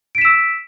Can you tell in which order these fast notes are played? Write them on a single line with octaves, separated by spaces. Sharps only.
D7 B6 E7 E6